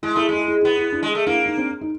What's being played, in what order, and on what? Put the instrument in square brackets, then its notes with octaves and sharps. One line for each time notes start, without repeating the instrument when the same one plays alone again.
[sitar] G#3 [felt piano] E4
[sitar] A3 [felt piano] E4
[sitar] G#3 [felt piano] E4
[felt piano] E4
[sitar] B3 [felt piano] E4
[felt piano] E4
D4 E4
[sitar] G#3
A3
[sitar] A#3 [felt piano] D4 E4
[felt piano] D#4
C4 D4
D#4